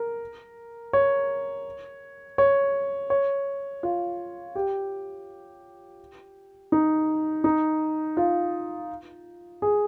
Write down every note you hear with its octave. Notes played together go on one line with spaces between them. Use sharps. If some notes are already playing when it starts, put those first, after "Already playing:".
Already playing: A#4
C#5
C#5
C#5
F4
G4
D#4
D#4
F4
G#4